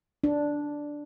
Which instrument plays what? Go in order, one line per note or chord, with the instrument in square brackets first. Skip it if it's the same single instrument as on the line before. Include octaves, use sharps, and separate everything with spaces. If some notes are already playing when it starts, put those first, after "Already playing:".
[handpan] D4